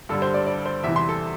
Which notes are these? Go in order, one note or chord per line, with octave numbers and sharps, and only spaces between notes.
G2 D3 G3 A4
C5
D5
D5
C5
E2 C3 E3 E5
C6
A4